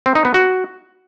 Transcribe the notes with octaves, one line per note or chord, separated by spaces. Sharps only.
C4
D#4
B3
F#4